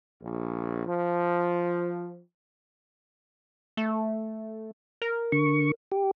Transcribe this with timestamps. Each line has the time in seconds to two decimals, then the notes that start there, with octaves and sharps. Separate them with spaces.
0.21 A#1
0.86 F3
3.77 A3
5.02 A#4
5.32 D3 C#6
5.92 G4